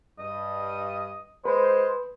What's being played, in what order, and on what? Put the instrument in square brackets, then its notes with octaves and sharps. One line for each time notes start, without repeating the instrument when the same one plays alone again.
[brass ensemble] G2 [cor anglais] D#5
[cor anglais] G#3 [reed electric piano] B4 [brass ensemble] C5